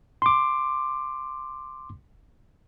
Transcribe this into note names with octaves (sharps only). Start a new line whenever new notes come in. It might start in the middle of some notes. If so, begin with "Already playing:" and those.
C6 D6